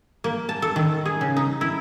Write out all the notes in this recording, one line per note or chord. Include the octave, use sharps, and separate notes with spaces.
A#3
A5
A4
D#3
G#4
C#3
D#4
E4